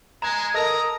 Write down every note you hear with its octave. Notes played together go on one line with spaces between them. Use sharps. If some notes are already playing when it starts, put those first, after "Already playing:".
G#3 G#5 A#5 E7
A4 A#4 D#5 A#5 D#6